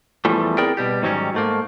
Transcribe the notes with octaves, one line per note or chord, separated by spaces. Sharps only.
E2 E3 F3 G3 A3
C4 E4 G#4 A#4 D5 G5
B2 G3 G4
G#2 D#3 F#3 G3 C#4
G#2 A3 A#3